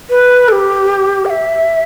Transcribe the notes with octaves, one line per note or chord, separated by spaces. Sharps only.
B4
A4
G4
G5
E5